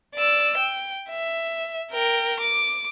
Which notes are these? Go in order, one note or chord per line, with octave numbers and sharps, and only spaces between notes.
D5 E6
G5
E5
A#4 G5
D6